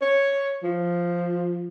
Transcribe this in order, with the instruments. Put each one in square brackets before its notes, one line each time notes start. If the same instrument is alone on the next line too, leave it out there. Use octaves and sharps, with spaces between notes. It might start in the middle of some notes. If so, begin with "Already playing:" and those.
[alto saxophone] C#5
F3